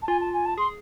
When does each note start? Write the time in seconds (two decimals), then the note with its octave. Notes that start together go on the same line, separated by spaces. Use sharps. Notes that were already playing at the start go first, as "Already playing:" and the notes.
0.02 A5
0.08 F4 G#5
0.20 A5
0.33 G#5
0.45 A5
0.58 G#4 C6